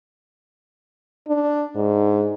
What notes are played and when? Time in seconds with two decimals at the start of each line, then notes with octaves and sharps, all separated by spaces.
1.28 D4
1.76 G#2